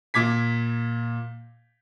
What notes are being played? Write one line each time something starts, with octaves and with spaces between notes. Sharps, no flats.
A#2 D6 G#6 B6